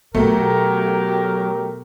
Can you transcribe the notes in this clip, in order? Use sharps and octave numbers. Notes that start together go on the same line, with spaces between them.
B2 F#3 A3 G4 A#4